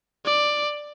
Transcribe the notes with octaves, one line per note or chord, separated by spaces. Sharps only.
D5